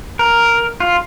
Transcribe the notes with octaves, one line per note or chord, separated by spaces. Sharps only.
A#4
F4